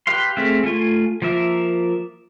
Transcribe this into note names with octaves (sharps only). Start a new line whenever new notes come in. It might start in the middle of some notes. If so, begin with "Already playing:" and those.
G4 B4 F5 C6
A3 C4 G#4 E5 F5
A3 F4 G#5
F3 A#3 A#4 E5